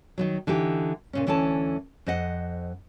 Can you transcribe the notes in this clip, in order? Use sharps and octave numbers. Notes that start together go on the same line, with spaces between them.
D#3 F3 F#3
D3 E3 D#4 G4
A#2 C#3 C#4
D2 E3 C#4 A4 A5
F2 C5 D#5 F#5